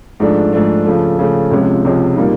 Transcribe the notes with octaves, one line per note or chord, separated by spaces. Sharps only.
G#2 F3 A3 D4
G#2 F3 A3 D4
C#3 F3 A3
C#3 F3 A3
C#2 C3 F3 G#3 C#4
C#2 C3 F3 G#3 C#4
A#2 G3 A#3 D#4